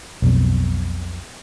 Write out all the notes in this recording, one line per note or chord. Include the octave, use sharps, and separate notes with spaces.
B1 F2 B2